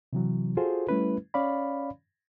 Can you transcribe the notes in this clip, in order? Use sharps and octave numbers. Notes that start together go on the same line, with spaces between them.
C3 E3 F#3
F4 F#4 G#4 A4 C5
G3 A3 C#4 E4 B4
C#4 C#5 D5 F5 B5